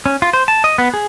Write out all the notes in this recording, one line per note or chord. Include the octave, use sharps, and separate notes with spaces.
C#4
F4
C5
A5
D#5
B3
G#4